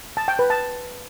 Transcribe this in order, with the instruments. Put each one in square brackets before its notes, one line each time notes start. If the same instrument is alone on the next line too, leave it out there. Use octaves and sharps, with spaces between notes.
[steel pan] A5
G5
B4
A5